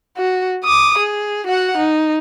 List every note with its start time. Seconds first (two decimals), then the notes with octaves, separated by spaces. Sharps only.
0.17 F#4
0.64 D6 D#6
0.99 G#4
1.47 F#4 F#5
1.77 D#4